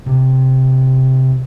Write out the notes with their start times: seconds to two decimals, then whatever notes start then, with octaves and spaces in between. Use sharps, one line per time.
0.06 C3